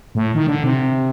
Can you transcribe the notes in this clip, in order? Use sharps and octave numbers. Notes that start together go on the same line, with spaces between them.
A2
D#3
D3
C3